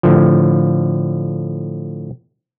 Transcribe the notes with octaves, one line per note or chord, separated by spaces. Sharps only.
A2 D3 F3